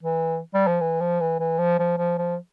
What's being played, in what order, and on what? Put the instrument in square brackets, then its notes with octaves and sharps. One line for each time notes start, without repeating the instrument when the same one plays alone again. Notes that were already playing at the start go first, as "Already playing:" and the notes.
[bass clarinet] E3
G3
F3
E3
F3
E3
E3
F3
F3
F3
F3